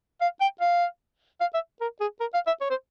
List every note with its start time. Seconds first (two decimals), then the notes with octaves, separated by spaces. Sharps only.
0.21 F5
0.41 G5
0.61 F5
1.40 F5
1.54 E5
1.81 A#4
2.00 G#4
2.20 A#4
2.34 F5
2.47 E5
2.61 C#5
2.70 C5